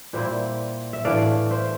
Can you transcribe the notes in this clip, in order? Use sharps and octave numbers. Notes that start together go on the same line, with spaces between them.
A#2 G3 A#3 E4 C5 E5
E5
A2 E3 A3 D4 D5 F5
C5 E5